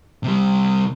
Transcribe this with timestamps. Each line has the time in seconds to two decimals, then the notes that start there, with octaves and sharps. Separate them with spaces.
0.24 C3 G3